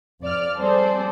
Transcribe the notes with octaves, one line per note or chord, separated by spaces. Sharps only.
F2 D5 F6
G3 C4 G#4 A4 C5 D5